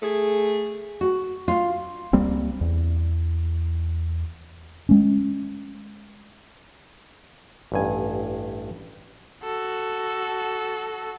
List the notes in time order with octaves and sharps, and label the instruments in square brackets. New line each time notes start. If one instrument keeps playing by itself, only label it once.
[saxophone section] A3 G#4
[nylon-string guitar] F#4
F4
[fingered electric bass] C#2 G3 A#3 C4
E2
G#3 C#4
[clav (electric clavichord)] A1 G2 G#5
[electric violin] F#4 A4